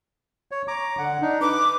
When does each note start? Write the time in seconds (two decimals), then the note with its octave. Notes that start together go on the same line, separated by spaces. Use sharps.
0.51 C#5
0.68 A#5 D6
0.98 D3 F#5
1.22 D4 D#4
1.41 B4 D6